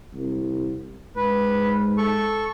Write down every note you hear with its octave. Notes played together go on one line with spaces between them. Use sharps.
C2
G#2 B4
A4 C#6